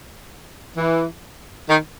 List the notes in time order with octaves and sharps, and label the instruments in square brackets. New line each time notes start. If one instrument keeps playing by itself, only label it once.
[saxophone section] E3
D#3